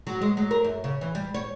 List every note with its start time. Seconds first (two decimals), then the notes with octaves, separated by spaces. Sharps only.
0.07 F#3
0.22 G#3
0.37 F#3
0.51 A#4
0.64 F#2
0.84 C#3
1.01 E3
1.15 G3
1.34 C#5